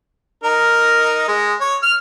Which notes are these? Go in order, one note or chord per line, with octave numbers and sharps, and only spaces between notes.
D#4 A#4
G#3
C#5
F6